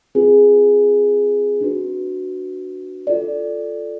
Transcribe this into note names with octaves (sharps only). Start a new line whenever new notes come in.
C4 F4 G#4 B4
D4 F#4 B4
F4 A4 D5